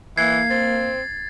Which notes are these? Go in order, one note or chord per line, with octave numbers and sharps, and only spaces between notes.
E3 A#3 G#6 C7
C4 A6